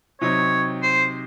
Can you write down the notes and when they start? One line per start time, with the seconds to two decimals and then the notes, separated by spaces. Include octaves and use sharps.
0.21 C3 F#3 C4 D#4 C#5
0.82 C5